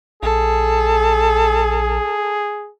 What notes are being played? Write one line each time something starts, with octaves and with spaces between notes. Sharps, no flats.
A#1 G#4 A4